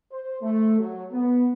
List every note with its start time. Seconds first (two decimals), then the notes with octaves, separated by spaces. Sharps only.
0.11 C5
0.41 A3
0.79 F#3
1.12 B3